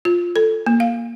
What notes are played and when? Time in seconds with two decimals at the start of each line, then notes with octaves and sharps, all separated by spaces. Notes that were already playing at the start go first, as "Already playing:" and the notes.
0.05 F4
0.36 A4
0.66 A#3
0.80 F5